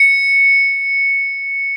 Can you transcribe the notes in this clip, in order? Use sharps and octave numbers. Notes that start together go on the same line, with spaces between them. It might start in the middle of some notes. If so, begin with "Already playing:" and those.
Already playing: C#7